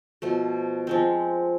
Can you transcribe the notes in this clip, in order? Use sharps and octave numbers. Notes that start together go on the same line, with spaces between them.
B2 F3 A3
F3 G#3 C4